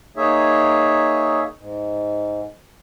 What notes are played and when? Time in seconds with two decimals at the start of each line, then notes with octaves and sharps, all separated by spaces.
0.17 A#3 D#4 G#4 C#5 E5
1.58 G#2